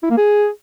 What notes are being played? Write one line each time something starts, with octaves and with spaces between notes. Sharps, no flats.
E4
A#3
G#4